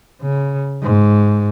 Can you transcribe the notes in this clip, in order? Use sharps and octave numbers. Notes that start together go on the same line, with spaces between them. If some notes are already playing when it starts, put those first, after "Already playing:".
C#3
G#2